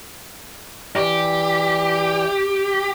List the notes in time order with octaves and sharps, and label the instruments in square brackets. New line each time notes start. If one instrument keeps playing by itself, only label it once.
[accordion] E3 D5 [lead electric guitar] G4